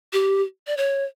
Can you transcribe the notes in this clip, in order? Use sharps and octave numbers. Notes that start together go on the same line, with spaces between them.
G4
D5
C#5